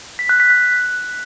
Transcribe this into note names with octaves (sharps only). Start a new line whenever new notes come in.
B6
F#6
B6
F#6